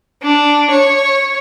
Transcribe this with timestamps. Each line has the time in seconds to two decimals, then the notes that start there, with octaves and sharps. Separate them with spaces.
0.23 D4
0.71 C#5